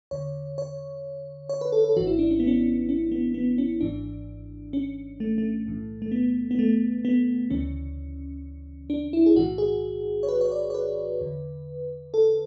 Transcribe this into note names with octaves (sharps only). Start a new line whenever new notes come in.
E2 D3 C#5
C#5
C#5
B4
A4
A4
G#1 G#2 E3 F#4
E4
D4
C#4
B3
C#4
C#4
B3
B3
C#4
G#1 G#2 E3 D4
C#4
A3
A3
B1 A2 E3
A3
B3
B3
A3
B3
D2 C#3 E3 C#4
D4
E4
G#4
B1 A2 E3 F#4
G#4
C#5
B4
C#5
D5
C#5
B4
E2 D3
A4